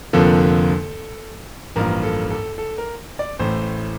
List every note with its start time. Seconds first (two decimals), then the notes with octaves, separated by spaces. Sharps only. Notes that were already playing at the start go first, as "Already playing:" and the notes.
0.13 F1 F2 D3 F3 A#3 A4
1.76 A1 G2 F3 A#3 A#4
2.03 A4
2.30 A4
2.58 A4
2.78 A#4
3.19 D5
3.39 A1 A2 A3 C5